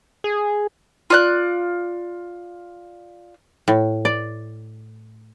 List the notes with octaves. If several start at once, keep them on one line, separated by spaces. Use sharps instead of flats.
G#4
F4 D5 F#6
A2
D5